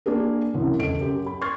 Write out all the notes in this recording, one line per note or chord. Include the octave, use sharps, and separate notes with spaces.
A#3 D4 G#4 A#4
C2 F#2 E3
E1 C#2 A4 D#5 D7
F#2 G4
B5
C6 C#6 F6 G#6 A6